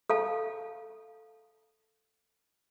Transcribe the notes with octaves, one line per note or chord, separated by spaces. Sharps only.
A4 F5 A5